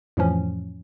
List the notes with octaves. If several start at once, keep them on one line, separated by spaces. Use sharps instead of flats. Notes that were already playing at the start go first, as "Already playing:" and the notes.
F2 A2 E3 F3 C#4